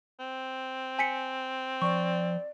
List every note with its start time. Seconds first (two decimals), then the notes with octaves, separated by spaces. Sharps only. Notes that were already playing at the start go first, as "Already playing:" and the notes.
0.20 C4
0.99 G#5 B6 C#7
1.82 F3 D5 C#6